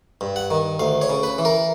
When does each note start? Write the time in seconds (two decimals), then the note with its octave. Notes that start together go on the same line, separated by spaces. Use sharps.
0.21 G2
0.36 F#5
0.51 D#3
0.79 D2 F5
1.02 C#5
1.10 C#3
1.23 B4
1.38 E3
1.45 A#4